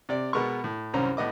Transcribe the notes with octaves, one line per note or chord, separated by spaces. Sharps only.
C3 D5
B2 G#3 B3 A#4 C#6
A2
C2 F#2 C#4 C5 A#5
A2 B3 D#5 D6